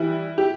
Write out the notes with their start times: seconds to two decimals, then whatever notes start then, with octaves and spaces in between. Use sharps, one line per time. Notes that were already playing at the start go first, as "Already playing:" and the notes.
Already playing: E3 G3 E4
0.38 G4